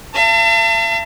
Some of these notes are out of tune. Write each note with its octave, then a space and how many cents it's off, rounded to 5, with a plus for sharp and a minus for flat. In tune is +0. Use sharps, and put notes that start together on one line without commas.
E5 +45 A5 +35